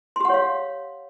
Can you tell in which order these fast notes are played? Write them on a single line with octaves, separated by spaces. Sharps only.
C6 G4 F#5 C#5 F5